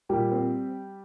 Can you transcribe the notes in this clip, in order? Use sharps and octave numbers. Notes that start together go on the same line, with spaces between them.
A#2 G3 G4
C4